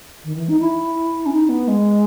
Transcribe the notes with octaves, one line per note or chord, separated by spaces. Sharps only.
D#3
E3
D#4
E4
C#4
D#4
B3
G#3